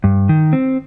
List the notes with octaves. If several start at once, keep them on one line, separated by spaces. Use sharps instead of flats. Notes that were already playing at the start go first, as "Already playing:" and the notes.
G2
D#3
C4